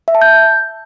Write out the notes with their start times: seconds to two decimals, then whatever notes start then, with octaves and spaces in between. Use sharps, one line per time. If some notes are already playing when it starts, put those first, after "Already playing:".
0.08 E5
0.15 A5
0.22 G6